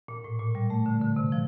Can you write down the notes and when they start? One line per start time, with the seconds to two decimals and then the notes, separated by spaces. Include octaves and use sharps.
0.08 A#2
0.24 A2
0.39 A#2
0.55 G3
0.70 A3
0.86 D3
1.01 D3
1.16 C3
1.32 F3